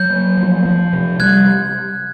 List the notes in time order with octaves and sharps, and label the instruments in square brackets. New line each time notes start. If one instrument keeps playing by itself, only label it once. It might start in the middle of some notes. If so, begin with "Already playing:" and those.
Already playing: [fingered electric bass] F#3 [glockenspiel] G6
[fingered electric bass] A#3
F3
F3
C3
[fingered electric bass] G3 [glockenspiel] F#6 G#6